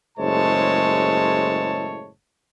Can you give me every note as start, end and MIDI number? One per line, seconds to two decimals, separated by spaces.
0.18 2.09 30
0.18 2.09 45
0.18 2.09 56
0.18 2.09 72
0.18 2.09 73
0.18 2.09 81